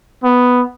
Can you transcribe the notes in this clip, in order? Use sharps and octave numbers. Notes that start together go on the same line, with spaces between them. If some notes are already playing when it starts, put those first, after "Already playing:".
B3